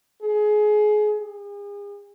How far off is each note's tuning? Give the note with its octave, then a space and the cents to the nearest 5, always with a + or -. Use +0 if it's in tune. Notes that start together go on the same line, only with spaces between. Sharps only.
G#4 +25
G#4 -40